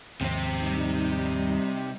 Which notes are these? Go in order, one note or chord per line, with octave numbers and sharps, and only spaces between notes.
D#2 G#2 C3 F3 C4
G3 D#4